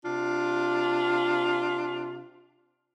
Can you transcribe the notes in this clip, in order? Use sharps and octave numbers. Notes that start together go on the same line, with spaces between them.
C3 D4 F4